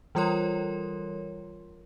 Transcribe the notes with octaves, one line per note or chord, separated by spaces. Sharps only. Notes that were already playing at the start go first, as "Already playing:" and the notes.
E3 G3 F4 A#4 C#5 C6